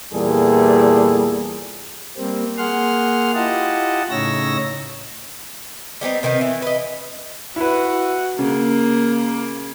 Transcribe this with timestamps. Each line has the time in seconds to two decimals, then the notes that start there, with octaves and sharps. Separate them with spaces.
0.13 E2 A#2 G3 G#4 A4
2.17 G3 A#3 C4
2.57 A#3 G#4 F#5 C6 F6
3.34 E4 F4 G4 D#5 F#5 A5
4.11 A2 C#3 D#4 C#5 E6 A#6
6.01 G3 B3 C4 D#4
6.23 C3 D#3 B3 C4
6.41 E3
6.62 B4 D#5
7.56 E4 F#4 B4
8.39 C#3 A#3